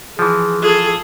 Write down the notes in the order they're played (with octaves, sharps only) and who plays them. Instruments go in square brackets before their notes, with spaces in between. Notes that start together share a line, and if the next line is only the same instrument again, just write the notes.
[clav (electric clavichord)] E3 F3 [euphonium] G#4
[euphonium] F4 [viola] G#4 A4